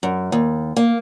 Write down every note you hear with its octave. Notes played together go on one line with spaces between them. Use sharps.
F#2
D#2
A#3